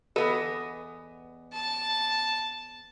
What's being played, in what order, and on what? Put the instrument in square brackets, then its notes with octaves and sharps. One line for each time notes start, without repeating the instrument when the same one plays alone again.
[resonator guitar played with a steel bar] E2 B3 D#5 [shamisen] A4 B4
[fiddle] A5